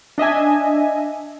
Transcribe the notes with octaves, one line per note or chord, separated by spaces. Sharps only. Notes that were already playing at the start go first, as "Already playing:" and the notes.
D4 D#5 E5 G#5